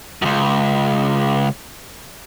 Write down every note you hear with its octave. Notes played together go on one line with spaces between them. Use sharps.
C#2 F#2